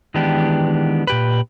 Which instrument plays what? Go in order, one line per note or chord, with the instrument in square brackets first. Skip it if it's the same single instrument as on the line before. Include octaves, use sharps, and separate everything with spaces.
[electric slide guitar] D#3 E3 G#3 B3 D4 G4
A#2 G4 B4